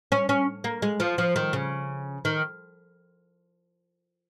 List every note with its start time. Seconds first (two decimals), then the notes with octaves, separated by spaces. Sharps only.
0.12 C#4
0.29 C#4
0.64 A#3
0.82 G#3
1.00 F3
1.18 F3
1.36 D#3
1.53 C#3
2.25 D#3